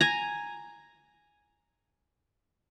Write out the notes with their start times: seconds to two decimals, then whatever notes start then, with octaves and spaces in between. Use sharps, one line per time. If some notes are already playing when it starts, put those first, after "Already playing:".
0.01 G#5 A#5